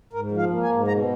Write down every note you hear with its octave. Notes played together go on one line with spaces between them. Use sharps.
G#2 A#4
F3
F5
A#3
G#5
G#2
B2 A#5